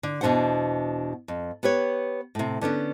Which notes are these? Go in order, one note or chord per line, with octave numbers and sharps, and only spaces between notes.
D3
E2 B2 F3 D4 C5 F#5
F2
B3 G4 B4 C#5
A2 C3
D3 B3 C#4 D4